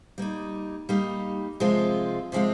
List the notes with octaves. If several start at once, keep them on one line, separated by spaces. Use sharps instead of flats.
G3 A#3 D#4
G3 A#3 D#4
C3 F3 G#3 C4 F4
C3 F3 G#3 C4 F4